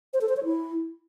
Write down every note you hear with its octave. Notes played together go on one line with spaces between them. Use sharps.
C5
A4
C5
C#5
E4